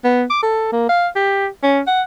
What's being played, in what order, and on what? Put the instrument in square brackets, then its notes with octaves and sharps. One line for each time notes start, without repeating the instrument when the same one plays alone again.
[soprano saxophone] B3
D6
A4
A#3
F5
G4
C#4
F#5